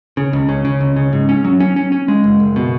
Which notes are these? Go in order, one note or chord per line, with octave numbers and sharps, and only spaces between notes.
C#3
C#2
C#3
C#3
C#2
C#3
G#2
C#4
F#3
C#4
C#4
C#4
G#3
F#1
F#1
B2